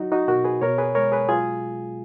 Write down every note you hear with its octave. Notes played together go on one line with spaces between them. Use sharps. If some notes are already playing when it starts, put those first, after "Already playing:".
Already playing: F#3 D#4 F#4
D#4 F#4
B2 F#4 A#4
G#4 B4
B2 A#4 C#5
G#4 B4
G#3 A#4 C#5
G#4 B4
F#3 F4 G#4